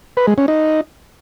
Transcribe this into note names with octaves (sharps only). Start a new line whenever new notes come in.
B4
G#3
C#4
D#4